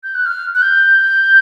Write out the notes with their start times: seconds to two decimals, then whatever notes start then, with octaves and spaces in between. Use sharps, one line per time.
0.04 G6
0.15 F#6
0.26 F6
0.55 F#6
0.62 G6